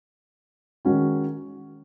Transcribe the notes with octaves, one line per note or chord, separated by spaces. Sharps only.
D#3 G#3 C#4 F#4